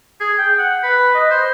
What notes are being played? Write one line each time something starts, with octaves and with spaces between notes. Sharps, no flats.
G#4
G5
F#5
B4
D#5
C5